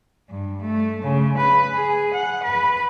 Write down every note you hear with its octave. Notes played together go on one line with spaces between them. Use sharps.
G2
A3
C#3
B4
G#4
F#5
B4